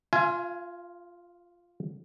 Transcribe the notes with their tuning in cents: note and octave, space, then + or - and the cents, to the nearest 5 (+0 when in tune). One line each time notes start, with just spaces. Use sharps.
F4 +0 F5 -45 G#5 +10